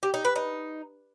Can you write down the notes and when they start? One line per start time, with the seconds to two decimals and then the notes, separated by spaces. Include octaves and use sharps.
0.03 G4
0.14 D#4
0.25 B4
0.36 D#4